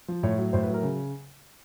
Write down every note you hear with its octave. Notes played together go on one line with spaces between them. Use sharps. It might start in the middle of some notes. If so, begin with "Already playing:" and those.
F3
A2 C#5
F#3
A2 C5
B4
F#3
A#4
C#3